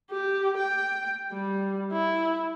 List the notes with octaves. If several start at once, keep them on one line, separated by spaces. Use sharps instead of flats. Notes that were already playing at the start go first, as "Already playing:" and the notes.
G4
G5
G3
E4